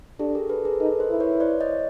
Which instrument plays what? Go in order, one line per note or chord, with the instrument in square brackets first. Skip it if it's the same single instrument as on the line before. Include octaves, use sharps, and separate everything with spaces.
[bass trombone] D4 [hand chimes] G4 A4
[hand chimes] G#4 A#4
A4 B4
G#4 A#4
[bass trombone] D#4 [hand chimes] A4 B4
[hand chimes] A#4 C5
[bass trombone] E4
[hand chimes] B4 C#5
C5 D5
C#5 D#5